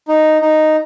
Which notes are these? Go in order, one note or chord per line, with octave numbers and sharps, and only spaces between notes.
D#4
D#4